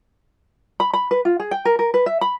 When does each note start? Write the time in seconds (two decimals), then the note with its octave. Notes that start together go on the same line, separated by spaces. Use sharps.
0.80 B5
0.93 B5
1.11 B4
1.25 F4
1.40 G#4
1.51 G5
1.65 A#4
1.79 A#4
1.94 B4
2.06 E5
2.21 B5